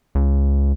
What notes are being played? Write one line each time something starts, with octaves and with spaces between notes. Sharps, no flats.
C#2